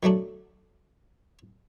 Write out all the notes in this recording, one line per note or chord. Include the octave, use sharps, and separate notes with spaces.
D#3 F#3 A3 D4